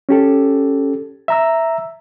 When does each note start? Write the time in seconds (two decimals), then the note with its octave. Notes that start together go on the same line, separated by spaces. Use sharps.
0.09 C#4 G4 A4
1.28 E5 A#5 E6